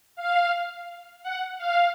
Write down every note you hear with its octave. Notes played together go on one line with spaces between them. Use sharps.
F5
F#5
F5